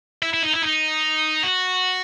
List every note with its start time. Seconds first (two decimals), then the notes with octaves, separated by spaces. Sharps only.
0.22 E4
0.33 E4
0.43 D#4
0.53 E4
0.62 D#4
1.43 F#4